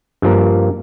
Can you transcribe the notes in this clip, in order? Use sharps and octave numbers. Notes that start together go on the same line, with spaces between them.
G2 F3 A#3